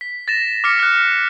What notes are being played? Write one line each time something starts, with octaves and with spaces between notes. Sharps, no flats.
B6
A6 A#6 E7
D6 F6 B6 C#7
F6 F#6